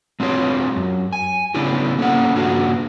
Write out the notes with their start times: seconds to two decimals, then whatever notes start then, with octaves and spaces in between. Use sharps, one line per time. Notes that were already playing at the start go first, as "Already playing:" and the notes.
0.20 G#3 C4 F4 G4 C#5
0.76 F#2
1.13 G#5
1.54 C#3 B3 C#4 D4 E4 G4
1.99 A#3 C#4 A4 F#5
2.35 G2 C#3 A#3 D4 F4 F#4